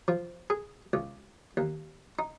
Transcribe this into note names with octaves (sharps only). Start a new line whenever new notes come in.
F3
G#4
C#2
D#2
D#4